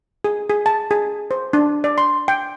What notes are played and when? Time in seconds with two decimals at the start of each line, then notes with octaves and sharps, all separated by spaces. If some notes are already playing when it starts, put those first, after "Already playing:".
0.24 G#4
0.50 G#4
0.66 A5
0.91 G#4
1.31 C5
1.53 D4
1.84 D5
1.98 C6
2.28 G5